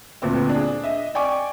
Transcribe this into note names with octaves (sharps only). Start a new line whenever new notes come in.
D2 A#2 B3 C4
D4 G#4
D#5 E5
D5 G5 G#5 C#6 D6